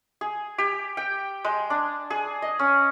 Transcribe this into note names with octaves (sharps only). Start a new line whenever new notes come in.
G#4
G4
G5
G#3
D4
G#4
D#5
C#4